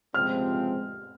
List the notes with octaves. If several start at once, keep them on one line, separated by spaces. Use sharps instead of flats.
C#2 C3 F3 G#3 C4 F6